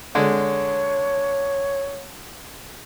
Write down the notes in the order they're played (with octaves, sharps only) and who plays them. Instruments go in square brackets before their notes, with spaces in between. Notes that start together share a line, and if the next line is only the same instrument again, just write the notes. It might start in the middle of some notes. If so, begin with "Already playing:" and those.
[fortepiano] D3 G#3 [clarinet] C#5